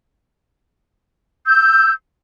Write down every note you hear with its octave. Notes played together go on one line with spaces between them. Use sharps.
E6 G6